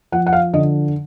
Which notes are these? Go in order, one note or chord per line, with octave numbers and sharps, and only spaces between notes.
F3 F#5
F#5
F5
D3 D#5